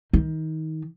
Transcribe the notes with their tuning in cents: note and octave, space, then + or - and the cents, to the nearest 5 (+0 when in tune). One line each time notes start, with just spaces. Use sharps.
D#3 +25